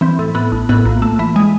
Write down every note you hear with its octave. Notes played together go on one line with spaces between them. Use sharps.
E3 C4
A2
A2 B3
A1
A2 B3
A#1
A#1 A3
E3
G#3